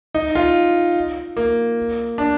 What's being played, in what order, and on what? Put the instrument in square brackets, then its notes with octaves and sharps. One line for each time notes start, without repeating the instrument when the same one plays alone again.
[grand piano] D#4
F4
A#3
D4